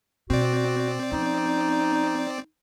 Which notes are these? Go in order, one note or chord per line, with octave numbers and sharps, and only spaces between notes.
B2 C4 F#4 D5
F3 C#4 D#4